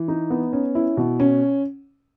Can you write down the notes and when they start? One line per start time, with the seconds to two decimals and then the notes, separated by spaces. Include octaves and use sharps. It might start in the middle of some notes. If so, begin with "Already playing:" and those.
Already playing: E3
0.08 D#4
0.30 B3
0.53 C#4
0.75 E4
0.97 B2
1.20 C#4